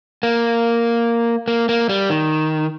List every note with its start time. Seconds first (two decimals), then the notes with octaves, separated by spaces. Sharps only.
0.23 A#3
1.48 A#3
1.69 A#3
1.89 G3
2.10 D#3